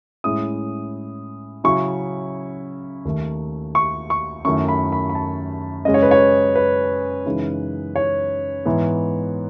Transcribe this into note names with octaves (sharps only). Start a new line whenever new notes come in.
A2 G#3 C#4 E4 D#6
C#3 F#3 C#4 E4 C#6
D#2 D#3 A3
C#6
C#6
F#2 D#3 A3 E4 C#6
B5
B5
B5
A5
F#2 C#3 G#3 C#4 D#5
C#5
B4
C#5
B4
F#2 C#3 E3 G#3 D#4
C#5
G#2 E3 B3